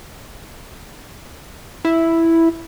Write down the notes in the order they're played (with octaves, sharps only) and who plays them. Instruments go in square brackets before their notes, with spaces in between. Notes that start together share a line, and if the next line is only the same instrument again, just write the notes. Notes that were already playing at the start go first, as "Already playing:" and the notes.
[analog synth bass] E4